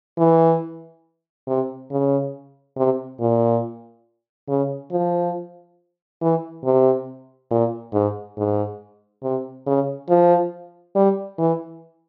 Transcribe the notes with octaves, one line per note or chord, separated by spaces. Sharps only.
E3
C3
C#3
C3
A#2
C#3
F3
E3
C3
A#2
G#2
G#2
C3
C#3
F3
G3
E3